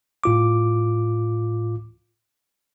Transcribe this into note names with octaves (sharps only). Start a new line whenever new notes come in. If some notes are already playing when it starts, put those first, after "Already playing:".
A2 F4 D6